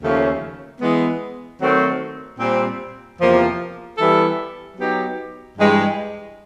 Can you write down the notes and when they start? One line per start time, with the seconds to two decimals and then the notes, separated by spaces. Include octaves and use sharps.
0.02 D#2 C#3 F3 A3 C#4
0.81 E3 G#3 B3
1.61 D#3 F#3 A3 C4
2.39 A#2 G3 C4
3.19 E2 C3 F3 A#3
3.98 E3 G3 B3 E4 A4
4.77 F#3 B3 D#4 G4
5.58 G2 E3 G#3